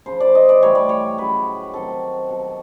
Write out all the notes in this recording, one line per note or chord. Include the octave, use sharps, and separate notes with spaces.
C#3 F3 C5
D5
D#5
D5
A2 E3 G3 C#5
D5
C#5
C#3 F#3 B4
C3 D#3 F#3 A4
B2 F#3